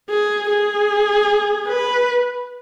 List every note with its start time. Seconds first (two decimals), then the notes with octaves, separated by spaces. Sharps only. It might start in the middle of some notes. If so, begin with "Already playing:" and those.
0.10 G#4
0.49 G#4
1.67 B4